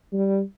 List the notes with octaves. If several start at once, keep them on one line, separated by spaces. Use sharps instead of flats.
G3